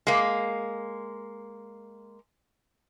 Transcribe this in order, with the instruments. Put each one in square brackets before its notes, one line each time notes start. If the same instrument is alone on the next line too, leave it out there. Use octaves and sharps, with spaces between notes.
[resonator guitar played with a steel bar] G#3 A#3